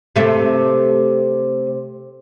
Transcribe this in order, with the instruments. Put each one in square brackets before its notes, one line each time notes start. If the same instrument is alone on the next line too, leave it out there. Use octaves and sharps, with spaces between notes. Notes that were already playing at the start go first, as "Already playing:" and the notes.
[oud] C3 A3